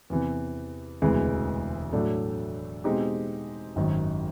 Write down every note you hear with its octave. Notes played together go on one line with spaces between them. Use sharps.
E2 C3 E3
E1 D2 C3 E3 G#3
A2 F#3 A3 D4
B2 G#3 C4 D#4 G4
G#1 F#2 D#3